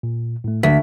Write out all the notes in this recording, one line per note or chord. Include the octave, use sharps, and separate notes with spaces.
A#2
A2 A3
D2 B6